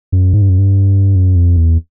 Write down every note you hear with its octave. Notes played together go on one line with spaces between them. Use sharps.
F#2
G#2
G2
F#2
G2
F#2
F2
E2